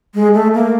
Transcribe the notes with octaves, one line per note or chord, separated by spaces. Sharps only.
G#3
A3
A#3